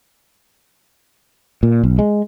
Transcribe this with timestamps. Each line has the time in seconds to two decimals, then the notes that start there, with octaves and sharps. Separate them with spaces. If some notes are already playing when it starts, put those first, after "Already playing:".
1.63 A#2
1.84 B1
1.99 G#3